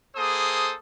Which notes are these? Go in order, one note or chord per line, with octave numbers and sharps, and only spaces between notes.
A#3 G#4 A4 C5 D#6